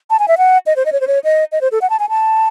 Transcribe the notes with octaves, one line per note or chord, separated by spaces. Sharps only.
A5
G#5
E5
F#5
D#5
C5
D#5
C#5
C5
C#5
D#5
D#5
C5
A4
F#5
A5
G#5
A5